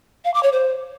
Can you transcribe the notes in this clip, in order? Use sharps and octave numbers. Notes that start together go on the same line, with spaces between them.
F5
D6
C#5
C5